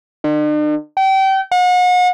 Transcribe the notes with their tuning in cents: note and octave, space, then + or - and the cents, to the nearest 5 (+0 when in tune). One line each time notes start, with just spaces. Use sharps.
D3 +45
G5 -30
F#5 -40